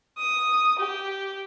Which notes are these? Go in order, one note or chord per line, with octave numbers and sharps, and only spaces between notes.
D#6
G4